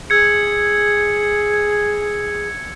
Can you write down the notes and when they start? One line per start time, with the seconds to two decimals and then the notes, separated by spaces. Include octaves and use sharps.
0.10 G#4 E6 G#6 C#7